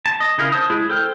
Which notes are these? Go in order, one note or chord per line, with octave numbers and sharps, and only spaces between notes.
A5
D#5
C#3 D#4 E4 A#4 F5
C5 A5 D#6
G#3 E4 G#4
A4 C5 G5 F6